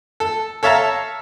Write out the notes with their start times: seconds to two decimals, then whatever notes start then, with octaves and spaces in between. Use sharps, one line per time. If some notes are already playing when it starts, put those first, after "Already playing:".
0.20 A4
0.63 A4 C#5 E5 F5 A5 A#5